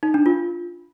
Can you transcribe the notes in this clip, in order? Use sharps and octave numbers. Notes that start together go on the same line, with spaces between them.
D#4
D4
F4